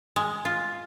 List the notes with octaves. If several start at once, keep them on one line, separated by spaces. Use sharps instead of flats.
G#3
F4